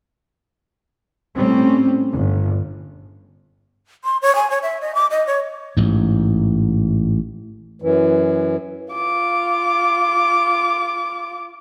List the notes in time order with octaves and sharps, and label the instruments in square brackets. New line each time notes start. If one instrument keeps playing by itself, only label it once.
[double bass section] A2 G3 C4 C#4
G1
[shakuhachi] C6
C#5
G#5
C#5
E5
D#5
D6
D#5
C#5
[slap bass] A1 G#2
[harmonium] F#2 E3
[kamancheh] F4 D6